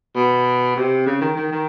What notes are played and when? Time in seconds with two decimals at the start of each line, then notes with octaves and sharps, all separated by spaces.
0.15 B2
0.76 C3
1.06 C#3
1.21 D#3
1.36 D#3
1.52 D#3